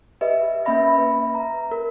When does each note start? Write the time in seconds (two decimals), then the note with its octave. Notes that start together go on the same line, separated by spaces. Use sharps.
0.21 G4 B4 D#5 E5
0.65 A#3 C#4 E5 B5 A#6
0.98 B4
1.35 A#5
1.71 A#4